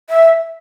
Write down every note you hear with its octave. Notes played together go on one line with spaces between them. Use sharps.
E5